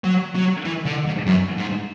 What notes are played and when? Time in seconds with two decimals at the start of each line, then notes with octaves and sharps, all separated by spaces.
0.04 F#3
0.35 F#3
0.65 E3
0.85 D3
1.06 G#2
1.26 F#2
1.57 G#2